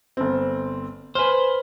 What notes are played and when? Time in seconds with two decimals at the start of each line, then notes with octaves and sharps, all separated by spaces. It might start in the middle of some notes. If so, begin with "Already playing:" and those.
0.17 G1 C4
1.15 B4 C5 G#5 F6